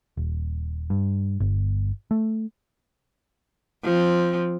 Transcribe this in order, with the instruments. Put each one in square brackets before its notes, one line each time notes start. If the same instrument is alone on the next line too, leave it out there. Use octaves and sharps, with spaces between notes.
[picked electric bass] D#1
G2
G1
A3
[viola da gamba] F3 C4